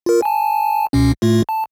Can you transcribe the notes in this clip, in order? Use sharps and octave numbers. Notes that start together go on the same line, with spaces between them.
F4 A#4
G#5 A5
C#2 B2 C#4
A2 A3 F4
A5